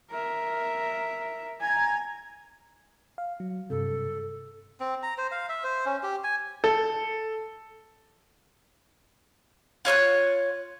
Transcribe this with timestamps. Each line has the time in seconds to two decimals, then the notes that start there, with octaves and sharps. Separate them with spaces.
0.11 A#4 E5
1.61 G#5 A#5 G#6
3.18 F5
3.40 F#3
3.70 G2 C3 A4
4.80 C4
5.03 A#5
5.18 C5
5.32 F5
5.49 E5
5.64 C5
5.86 C#4
6.03 G4
6.24 G#5
6.64 A4
9.85 F4 C#5 F6 F#6